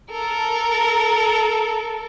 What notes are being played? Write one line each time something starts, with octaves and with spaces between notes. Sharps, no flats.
A4 A#4